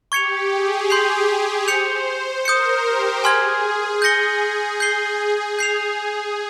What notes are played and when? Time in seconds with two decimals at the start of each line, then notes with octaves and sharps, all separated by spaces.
0.11 G4 C#6 G#6 C#7 F7
0.51 G#4
0.90 G#4 C6 G6 C7 F7
1.29 G#4
1.68 C5 G6 C#7 F7
2.45 A#4 D#6 G6 C#7
2.85 G4
3.24 G#4 G#5 C6 F6 G#6
4.02 G#4 G6 A#6 C#7 G7
4.80 G6 C7 G7
5.59 G6 C7 F7